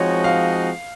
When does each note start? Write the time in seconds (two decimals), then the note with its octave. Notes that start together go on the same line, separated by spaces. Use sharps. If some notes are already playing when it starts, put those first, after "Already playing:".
Already playing: F3 G#3 C4 D#4 F#4 C#5
0.24 F5